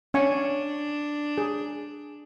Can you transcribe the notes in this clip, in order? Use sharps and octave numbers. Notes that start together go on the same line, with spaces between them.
C#4 D4 G#5 C#6
G#4